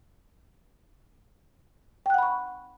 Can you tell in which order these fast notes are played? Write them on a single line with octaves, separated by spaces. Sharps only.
G5 F#6 F#5 B5 C#6